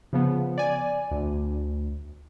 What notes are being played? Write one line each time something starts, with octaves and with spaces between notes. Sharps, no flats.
C#3 F3 B3
D5 G#5
D2